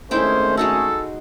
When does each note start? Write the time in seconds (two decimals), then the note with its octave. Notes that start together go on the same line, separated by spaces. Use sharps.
0.11 G#1 A3 C#4 D#4 E4 C5 G5
0.57 G#3 D#4 F#4 A4